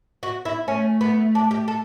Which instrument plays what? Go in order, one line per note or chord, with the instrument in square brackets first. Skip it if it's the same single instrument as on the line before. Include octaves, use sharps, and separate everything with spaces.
[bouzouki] F#4
E4
[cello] A3 [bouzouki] C#4
[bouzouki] B3
D4
G4
A4